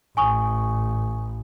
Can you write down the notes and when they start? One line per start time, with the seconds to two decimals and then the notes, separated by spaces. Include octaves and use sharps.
0.17 A1 G#5 C#6 D#6